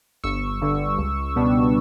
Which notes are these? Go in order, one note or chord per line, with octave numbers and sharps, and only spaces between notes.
G1 C#6 E6
G2 D3
C#2
B2 G3 B3 D4